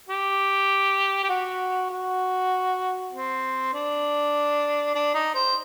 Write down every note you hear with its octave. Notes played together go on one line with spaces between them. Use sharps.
G4
G4
F#4
F#4
C4
D4
D4
D#4
C5